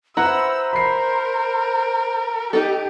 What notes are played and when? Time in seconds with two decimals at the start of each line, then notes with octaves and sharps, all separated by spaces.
0.17 E4 B4 C5 F#5 A#5 E6
0.73 A#4 B5 C7
2.53 D#4 G4 A4